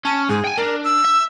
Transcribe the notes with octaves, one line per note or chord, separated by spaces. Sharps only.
C#4 A5
G#2 G#4
G5 G#5
D4 A#4
E6
E5